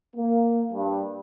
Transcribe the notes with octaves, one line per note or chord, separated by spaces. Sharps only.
A#3
G2